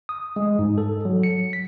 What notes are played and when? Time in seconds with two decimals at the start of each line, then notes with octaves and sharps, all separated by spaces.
0.09 D#6
0.36 G#3
0.59 G#2
0.78 A4
1.05 F#3
1.23 C#7
1.53 B6